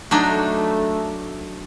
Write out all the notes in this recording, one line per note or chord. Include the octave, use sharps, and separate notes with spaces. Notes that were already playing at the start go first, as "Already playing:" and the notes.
F#3 A3 D4 D#4